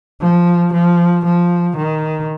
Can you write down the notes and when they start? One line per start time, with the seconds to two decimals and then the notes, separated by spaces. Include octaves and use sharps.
0.21 F3
0.73 F3
1.25 F3
1.77 D#3